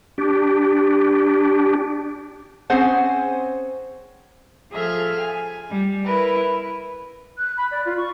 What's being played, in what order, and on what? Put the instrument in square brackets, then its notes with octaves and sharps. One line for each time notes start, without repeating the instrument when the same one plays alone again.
[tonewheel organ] D4 G4
[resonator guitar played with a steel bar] C4 C#4 G#4 C5 F#5
[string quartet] F3 G#4 A4 E5 F6
G#5
G3
E4 A#4 B4
[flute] F#6
B5
D5
F4
C#6